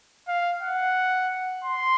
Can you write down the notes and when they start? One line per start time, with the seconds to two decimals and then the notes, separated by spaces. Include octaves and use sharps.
0.28 F5
0.62 F#5
1.64 C6